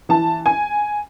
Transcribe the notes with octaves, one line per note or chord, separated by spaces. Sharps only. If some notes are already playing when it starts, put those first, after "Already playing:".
E3 A5
G#5